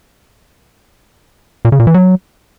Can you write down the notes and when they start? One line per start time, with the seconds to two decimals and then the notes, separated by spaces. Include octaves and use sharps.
1.65 A#2
1.72 C#3
1.80 A#2
1.87 E3
1.94 F#3